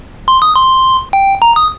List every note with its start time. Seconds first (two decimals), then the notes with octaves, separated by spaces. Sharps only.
0.28 C6
0.42 D#6
0.56 C6
1.13 G5
1.42 A#5
1.56 D#6